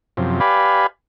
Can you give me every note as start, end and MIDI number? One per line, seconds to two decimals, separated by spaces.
0.17 0.40 42
0.17 0.40 48
0.17 0.40 53
0.40 0.87 67
0.40 0.87 71
0.40 0.87 74
0.40 0.87 77
0.40 0.87 80
0.40 0.87 83